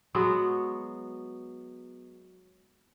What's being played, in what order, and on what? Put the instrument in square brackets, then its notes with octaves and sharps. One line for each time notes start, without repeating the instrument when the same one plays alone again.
[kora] F#3 G#3 B3 F#4